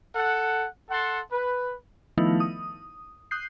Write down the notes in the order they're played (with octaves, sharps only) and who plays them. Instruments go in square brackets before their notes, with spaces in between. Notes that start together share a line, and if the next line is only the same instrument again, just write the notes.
[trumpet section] A4 F#5
A4 F#5 A5 C6
B4
[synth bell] D#3 F3 A3 B3 D#4 E4
D#6
D#6 F#6 G6 C7